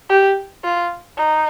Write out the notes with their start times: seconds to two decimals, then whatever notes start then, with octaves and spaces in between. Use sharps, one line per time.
0.09 G4
0.64 F4
1.17 D#4